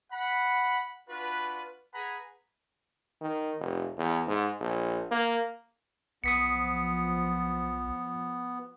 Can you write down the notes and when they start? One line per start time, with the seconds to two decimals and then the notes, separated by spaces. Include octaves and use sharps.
0.12 F#5 B5
1.09 D4 F4 F#4 B4
1.94 G#4 B4 F#5 G#5 A#5 B5
3.21 D#3
3.59 F1
3.98 E2
4.27 G#2
4.60 A#1
5.11 A#3
6.24 B1 F3 B3 D#6 B6 C#7